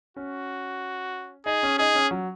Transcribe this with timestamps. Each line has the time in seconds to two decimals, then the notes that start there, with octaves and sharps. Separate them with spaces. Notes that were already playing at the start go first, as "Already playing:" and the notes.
0.16 C#4 F#4
1.46 D#4 G#4
1.63 C#4
1.78 D#4 G#4
1.95 C#4
2.11 F#3